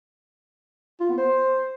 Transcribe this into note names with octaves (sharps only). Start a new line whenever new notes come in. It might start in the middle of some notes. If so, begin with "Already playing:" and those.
F4
B3
C5